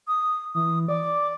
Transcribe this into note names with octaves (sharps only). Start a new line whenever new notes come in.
D#6
E3 D#6
D5 D6